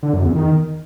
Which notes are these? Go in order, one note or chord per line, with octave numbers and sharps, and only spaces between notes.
D3
F#2
E2
D#3